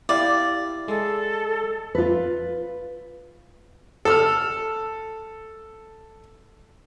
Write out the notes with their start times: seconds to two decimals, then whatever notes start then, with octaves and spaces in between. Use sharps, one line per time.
0.09 E4 G4 D5 F5
0.88 G#3 A4
1.95 F4 B4
4.05 A4 E6 F6